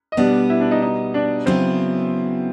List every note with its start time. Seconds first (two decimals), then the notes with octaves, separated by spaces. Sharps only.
0.12 D#5
0.17 B2 G3 B3 D4 D5
0.50 E4 E5
0.60 D4 D5
0.71 D#4 D#5
0.82 D#4 D#5
1.14 D4 D5
1.46 C#3 F#3 B3 C4 E4 C5